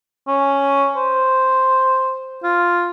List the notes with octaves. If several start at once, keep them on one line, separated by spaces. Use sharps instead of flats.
C#4
C5
F4